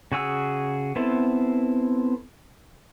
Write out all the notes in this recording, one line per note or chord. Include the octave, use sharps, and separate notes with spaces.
C#3 F#4 G#4 E6
B3 C4 E4 A4